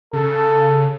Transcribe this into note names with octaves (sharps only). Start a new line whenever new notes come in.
C#3 A4